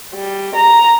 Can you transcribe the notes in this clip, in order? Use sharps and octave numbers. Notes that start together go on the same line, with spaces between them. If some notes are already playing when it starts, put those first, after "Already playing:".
G3
A#5